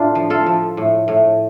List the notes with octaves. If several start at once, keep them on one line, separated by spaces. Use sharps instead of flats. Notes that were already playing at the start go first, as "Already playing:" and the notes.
Already playing: A2 D4 F4
F3
F4 A4
F3
A2
A2